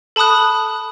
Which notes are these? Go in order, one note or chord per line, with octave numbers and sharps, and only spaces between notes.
A4 A5 B5 D#6 F#6